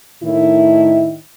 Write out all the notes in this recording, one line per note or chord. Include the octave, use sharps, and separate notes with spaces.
A2 D#3 E4